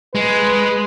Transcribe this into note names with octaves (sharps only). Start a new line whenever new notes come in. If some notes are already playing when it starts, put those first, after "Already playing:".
G#3 B4